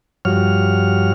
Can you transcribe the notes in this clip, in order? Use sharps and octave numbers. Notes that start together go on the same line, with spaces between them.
G2 F3 F#4 C#5 F6